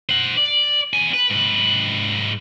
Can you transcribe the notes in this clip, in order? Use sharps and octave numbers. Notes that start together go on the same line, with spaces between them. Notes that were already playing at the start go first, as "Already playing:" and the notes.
C5 F#5
D5
B3 G#5
B4
G#2 B4